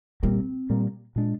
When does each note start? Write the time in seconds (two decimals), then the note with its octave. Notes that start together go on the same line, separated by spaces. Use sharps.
0.23 A#2 G3 A#3 C4
0.70 A#2 G3 A#3
1.16 A#2 G#3 D4